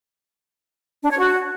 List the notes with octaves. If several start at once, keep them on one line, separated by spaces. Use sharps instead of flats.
D4
C#5
F#4